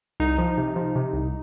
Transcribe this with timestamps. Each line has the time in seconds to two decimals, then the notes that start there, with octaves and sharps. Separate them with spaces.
0.20 C2 D#4
0.38 F3
0.58 C3
0.76 F3
0.96 C3
1.13 C2